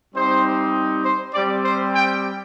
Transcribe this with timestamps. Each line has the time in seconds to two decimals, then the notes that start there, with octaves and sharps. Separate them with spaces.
0.14 G3 C4 D#4 G4 C5
1.04 C5
1.33 G3 C4 G4 D5
1.64 C5
1.93 G5